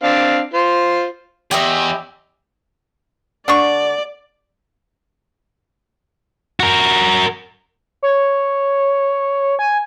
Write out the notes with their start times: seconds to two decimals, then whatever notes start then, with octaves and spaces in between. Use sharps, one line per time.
0.03 C4 D4 F5
0.54 F4 C5
1.51 E2 G4 D#5 E5
3.48 D3 D4 D5 C#6
6.60 F#4 A#4
8.03 C#5
9.59 G#5